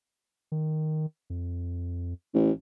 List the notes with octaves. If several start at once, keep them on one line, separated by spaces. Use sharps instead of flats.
D#3
F2
A1